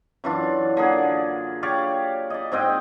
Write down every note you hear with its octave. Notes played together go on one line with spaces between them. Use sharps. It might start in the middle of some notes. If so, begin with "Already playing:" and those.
F#2 E3 D4 F4
D3 A#3 G#4
G4 C#5 D5 F5
D5 D#5
G#2 C4 D#5 G5